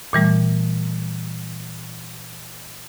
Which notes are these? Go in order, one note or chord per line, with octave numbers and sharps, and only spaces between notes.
A#2 E3 G3 A3